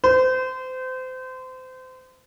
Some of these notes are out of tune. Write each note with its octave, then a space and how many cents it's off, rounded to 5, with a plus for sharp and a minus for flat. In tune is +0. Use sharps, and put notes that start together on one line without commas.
C5 -30